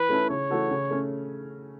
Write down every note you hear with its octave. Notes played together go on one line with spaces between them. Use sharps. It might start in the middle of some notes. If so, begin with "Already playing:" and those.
Already playing: E3 B4
A3 C#4 E4 A4
C#3 C#5
E3 A3 F#4 A4
C#3
A3 C#4